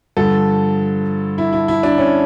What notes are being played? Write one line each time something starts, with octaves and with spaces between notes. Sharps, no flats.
G2 D3 F3 A4
E4
E4
E4
D4
C#4